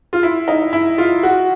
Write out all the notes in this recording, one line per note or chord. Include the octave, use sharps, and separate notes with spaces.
F4
E4
D#4
E4
F4
F#4